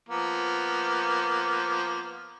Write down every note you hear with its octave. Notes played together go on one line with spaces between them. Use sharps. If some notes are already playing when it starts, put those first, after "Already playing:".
F3 A#3 B3